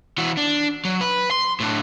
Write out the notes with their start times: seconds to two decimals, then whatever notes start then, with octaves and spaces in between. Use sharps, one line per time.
0.18 E3 F#4
0.37 D4
0.85 F#3
1.01 B4
1.31 C6
1.60 A2 D4